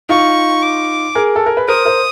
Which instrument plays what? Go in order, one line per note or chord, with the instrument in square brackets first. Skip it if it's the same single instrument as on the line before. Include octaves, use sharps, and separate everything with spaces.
[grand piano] D#4 F4 [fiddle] C#6
[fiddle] D6
[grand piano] G#4 A#4
A4
A#4
B4
[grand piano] A#4 C5 [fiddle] D#6
[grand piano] A#4 C5